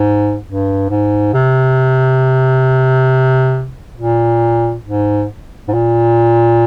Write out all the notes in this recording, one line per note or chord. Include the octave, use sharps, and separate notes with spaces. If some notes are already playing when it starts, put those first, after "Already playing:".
Already playing: G#2
G2
G#2
C3
A#2
G#2
G#2
A#2